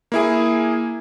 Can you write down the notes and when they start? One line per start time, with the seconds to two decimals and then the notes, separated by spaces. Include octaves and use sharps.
0.12 A#3 E4 G#4